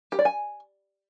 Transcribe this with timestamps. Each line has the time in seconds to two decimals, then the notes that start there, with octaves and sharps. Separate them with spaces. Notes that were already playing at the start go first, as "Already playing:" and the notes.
0.12 G4
0.19 D5
0.25 G#5